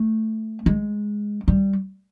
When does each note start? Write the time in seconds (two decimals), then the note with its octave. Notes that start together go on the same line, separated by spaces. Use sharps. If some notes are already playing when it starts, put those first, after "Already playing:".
Already playing: A3
0.66 G#3
1.48 G3